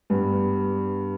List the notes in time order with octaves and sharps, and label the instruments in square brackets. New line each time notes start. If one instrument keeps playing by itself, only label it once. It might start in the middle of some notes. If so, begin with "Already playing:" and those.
[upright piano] G2 G3 B3